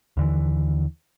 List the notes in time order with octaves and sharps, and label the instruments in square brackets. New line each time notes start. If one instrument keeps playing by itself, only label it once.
[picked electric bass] D#2 D3 E3